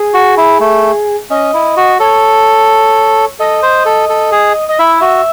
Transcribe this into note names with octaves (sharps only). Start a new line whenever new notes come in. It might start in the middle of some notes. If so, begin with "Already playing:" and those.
Already playing: G#4
F#4
E4
A3
C#4 D#5
E4
F#4
A4 C#5
A4 D#5
C5
A4
A4
G#4
D#5
E4 E5
F#4